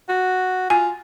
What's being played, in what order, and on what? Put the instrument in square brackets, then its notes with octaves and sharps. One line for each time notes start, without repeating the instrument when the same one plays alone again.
[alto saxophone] F#4
[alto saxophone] F4 [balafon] G#5